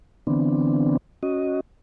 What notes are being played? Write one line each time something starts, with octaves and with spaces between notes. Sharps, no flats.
D3 E3 B3 C4 D4
C#4 F#4 D#5